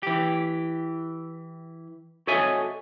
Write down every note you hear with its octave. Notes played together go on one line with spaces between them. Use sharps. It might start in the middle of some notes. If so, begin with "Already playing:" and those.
E3 G4
F#4 A4 C#5 D#5 E5 G#5